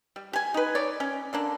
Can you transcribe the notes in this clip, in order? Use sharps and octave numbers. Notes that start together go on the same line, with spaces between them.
G3
G4 G#5
D#4 B4
C#5 D5
C#4
D3 A#3 D4